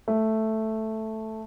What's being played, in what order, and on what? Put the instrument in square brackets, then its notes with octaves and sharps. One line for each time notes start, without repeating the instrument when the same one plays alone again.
[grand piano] A3